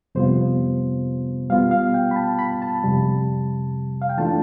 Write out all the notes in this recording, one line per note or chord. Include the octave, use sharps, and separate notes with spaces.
F2 C3 G3 B3 F4 C5
B2 G3 B3 F4 F5
F5
G5
B5
A5
B5
A5
F2 C3 G3
F5
G5
E3 A3 D4 F4 A5